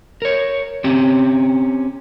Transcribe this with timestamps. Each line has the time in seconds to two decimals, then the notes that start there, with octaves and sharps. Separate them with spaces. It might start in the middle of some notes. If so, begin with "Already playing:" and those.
0.22 A#4 C#5
0.84 C4 C#4 G4